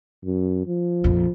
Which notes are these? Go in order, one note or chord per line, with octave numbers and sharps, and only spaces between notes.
F#2
F3
A#1 F2